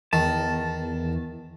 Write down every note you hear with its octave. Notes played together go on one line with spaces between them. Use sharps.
E2 D#3 A5